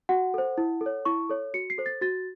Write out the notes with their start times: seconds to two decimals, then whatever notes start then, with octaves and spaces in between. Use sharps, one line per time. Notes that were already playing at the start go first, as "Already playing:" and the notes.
0.09 F#4 F#5
0.34 A4 C5
0.58 E4
0.81 A4
0.86 C#5
1.05 E4 C#6
1.29 A4 C#5
1.54 F#4 C#7
1.70 C7
1.78 A4 C5
1.86 A6
2.01 F#4 A6